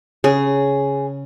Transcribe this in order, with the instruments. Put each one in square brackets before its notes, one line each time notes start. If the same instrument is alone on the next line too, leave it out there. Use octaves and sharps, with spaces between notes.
[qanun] C#3 [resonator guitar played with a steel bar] G#4